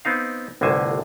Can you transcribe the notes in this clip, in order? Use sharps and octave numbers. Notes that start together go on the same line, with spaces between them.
B3 C4 D#4 F5
G1 C2 A2 D3 C5 G#5